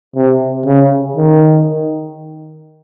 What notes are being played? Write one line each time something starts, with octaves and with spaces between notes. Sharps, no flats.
C3
C#3
D#3